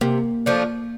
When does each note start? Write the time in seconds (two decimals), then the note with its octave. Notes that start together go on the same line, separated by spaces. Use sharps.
0.01 C3 A#3
0.46 F3 A3 D4